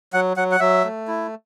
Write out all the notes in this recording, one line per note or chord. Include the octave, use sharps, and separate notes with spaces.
F#3 F#5
F#3 F#5
F#5
F#3 E5
A3
E4